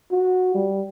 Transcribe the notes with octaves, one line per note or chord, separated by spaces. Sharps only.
F#4
G3